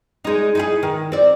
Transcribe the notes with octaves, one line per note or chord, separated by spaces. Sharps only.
G#3 D#4
D#4 E4 G#4
D#3
C4 D5